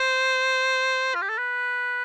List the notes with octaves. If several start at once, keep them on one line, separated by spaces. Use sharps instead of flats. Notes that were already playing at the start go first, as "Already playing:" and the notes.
Already playing: C5
F4
G4
A4
B4